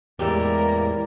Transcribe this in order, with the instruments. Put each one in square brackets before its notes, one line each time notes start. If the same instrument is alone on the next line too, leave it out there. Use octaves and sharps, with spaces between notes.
[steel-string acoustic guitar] E2 A2 [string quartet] G#3 A#3 A#4 [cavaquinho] G4 D5 E5